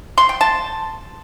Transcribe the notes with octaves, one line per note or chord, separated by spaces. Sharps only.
C6
G5
A5